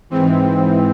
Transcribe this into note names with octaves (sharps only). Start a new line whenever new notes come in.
G#2 E3 C4